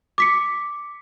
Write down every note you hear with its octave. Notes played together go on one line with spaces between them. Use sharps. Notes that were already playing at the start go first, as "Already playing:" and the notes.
D6 B6 C#7